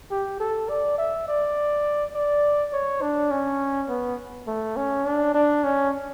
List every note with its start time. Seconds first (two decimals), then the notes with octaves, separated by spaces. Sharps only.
0.11 G4
0.40 A4
0.69 D5
0.98 E5
1.28 D5
2.14 D5
2.73 C#5
3.02 D4
3.31 C#4
3.89 B3
4.47 A3
4.77 C#4
5.05 D4
5.34 D4
5.64 C#4